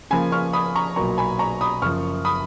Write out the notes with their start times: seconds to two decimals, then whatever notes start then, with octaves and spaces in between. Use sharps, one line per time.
0.10 C#3 F3 A#3 G#5 B5
0.32 C#6 F6
0.53 B5 D#6
0.76 A#5 C#6
0.96 B1 A#2 F#3 A#3 A#5 C#6
1.18 G#5 B5
1.39 A#5 C#6
1.61 B5 D#6
1.82 F#1 F#2 F3 C#6 F6
2.25 B5 D#6